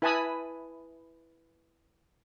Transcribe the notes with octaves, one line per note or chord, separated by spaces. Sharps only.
E4 B4 G#5 A5 B5 D#6